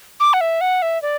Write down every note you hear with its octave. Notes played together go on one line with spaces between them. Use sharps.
D6
F#5
E5
F#5
E5
D5